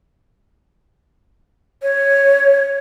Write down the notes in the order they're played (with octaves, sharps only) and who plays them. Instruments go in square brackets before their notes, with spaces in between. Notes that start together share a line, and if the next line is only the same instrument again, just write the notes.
[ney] C#5